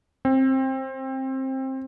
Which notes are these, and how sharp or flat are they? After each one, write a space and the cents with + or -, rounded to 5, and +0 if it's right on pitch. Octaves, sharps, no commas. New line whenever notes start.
C4 +20